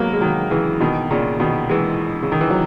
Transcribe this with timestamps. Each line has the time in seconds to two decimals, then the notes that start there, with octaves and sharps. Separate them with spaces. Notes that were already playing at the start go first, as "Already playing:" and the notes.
Already playing: F#3 G#3 A#3 B3
0.13 G#3
0.21 D#3 F#3
0.51 C#3 E3
0.80 B2 D#3
1.11 A#2 C#3
1.40 B2 D#3
1.70 E3 G#3
2.23 C#3
2.32 D#3
2.41 E3
2.50 F#3